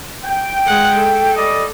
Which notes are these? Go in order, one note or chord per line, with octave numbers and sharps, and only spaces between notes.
G5
G#3 F#5
A4
G3 D5 D#5